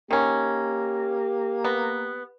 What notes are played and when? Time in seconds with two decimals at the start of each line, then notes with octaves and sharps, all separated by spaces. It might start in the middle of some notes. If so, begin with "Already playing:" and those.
0.11 D#3 A#3 C#4 G4
1.65 B3